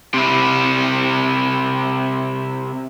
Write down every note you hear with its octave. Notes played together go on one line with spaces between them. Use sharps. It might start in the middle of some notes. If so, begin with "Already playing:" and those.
C3 E4